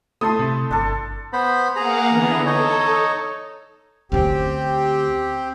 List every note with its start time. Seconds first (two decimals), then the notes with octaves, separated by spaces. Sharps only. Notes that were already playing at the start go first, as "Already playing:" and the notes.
0.21 A3 E4 A5 C6 D#6
0.39 C3
0.71 G1 D4 A4
1.33 B3 C5 B5
1.76 A#3 G#4 F5 F#5 A#5
2.10 D3 E3 B3
2.46 D#4 A4 C#5 D#5
4.12 D2 C4 C#4 G4